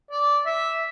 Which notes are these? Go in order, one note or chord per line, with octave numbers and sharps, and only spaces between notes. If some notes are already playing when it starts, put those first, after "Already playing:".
D5
E5